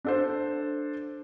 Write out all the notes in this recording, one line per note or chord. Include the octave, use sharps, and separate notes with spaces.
D4 A4 C5